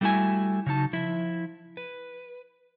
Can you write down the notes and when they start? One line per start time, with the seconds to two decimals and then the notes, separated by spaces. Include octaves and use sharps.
0.01 G3 A3 A#3 E4 F#4 G#5
0.66 C#3 F#3 D#4 A5
0.93 F3 E4 E5
1.77 B4